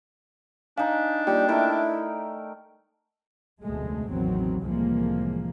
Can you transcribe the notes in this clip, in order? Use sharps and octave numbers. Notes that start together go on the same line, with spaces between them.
D4 D#4 F5 G#5
G3 A#3 F4 G5
A3 E4 A#4 D5 G5
F1 D2 B2 G#3 A3
A1 E2 B2 D#3 F#3 C4
C2 A2 E3 F3 G#3 A#3